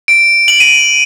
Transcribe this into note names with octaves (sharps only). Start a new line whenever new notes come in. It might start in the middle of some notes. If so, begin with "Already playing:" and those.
D7
F#7
D#7